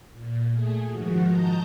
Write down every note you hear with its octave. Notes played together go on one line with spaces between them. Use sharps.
A#2
A3 G#4
G#2 D#3 F3 F#4
D#5 A5 A#5 G6